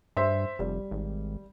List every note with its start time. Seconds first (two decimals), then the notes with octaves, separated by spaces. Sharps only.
0.17 G2 C5 E5 C6
0.59 F1 G3
0.91 G#1